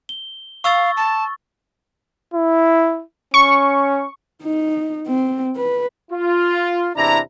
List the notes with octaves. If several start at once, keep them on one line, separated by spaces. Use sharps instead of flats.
G7
F5 C#6 E6 A6
A5
E4
C#4 C#6
D#4
C4
B4
F4
E2 C3 D4 E4 A#5